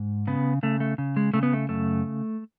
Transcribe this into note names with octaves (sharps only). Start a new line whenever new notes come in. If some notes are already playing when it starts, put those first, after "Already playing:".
Already playing: G#2
C#3 B3
C#3 A3
A3
C#3
G#3
C#3 A3
B3
A3
F#2 A3